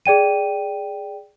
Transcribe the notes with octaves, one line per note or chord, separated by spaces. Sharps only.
G#4 D5 G5 D#7